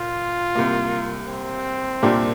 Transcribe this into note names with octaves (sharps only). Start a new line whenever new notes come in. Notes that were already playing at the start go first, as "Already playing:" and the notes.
Already playing: A#2 F4
C2 C3 A#3
C4
C2 A#2 A#3 D4 G4